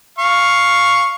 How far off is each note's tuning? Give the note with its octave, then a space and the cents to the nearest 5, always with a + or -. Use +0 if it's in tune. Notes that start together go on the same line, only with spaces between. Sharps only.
F5 +5 C#6 +0